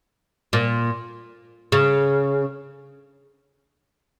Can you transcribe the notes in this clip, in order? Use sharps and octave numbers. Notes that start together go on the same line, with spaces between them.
A#2
C#3